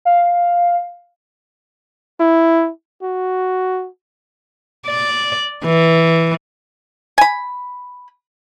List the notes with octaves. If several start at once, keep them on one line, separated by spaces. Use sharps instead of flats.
F5
E4
F#4
D5
E3
G#5 B5